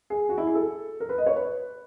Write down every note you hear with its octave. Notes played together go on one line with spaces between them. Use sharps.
G#4
F#4
E4
G#4
A4
A#4
B4
D#5
C#5
B4